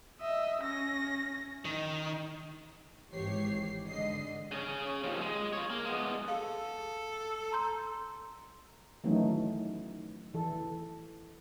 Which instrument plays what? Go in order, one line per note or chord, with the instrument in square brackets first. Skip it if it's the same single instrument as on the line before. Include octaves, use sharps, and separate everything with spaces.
[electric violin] D#5 E5
C#4 A#6
[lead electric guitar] D#3
[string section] G#1 G#2 E3 G4 C#5 C7
G#2 D3 D#5 C7
[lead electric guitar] C#3 C#4
D#2 F3
G#3
F4 C#5
A#3
G#3 B3
[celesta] G#4 F5 [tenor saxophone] A4
[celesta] A#5 C6 G6
[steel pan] D#3 E3 F#3 A3 C#4 D#4
E3 A4